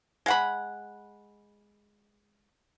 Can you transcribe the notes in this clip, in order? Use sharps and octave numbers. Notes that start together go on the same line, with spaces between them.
G#3 F#5 B5